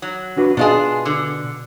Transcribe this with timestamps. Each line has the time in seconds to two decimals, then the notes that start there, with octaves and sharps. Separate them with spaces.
0.02 F#3
0.37 D4 F#4 B4
0.57 B2 B3 D4 F4 G#4 D#5
1.05 D3